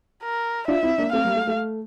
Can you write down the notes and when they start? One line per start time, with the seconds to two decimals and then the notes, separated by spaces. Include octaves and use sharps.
0.23 A#4
0.68 D4 F4 E5
0.83 C4 E4
0.98 A#3 D4
1.13 A3 C4 F5
1.24 G3 A#3
1.36 A3
1.47 A3